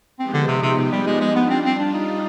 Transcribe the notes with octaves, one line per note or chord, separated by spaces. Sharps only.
F3 G#3 B3 C4 D#4 G4
D3
C3
C3
C3
G3
G#3
G#3
G3 B3 D4 F4
C4
C4
D4
D#4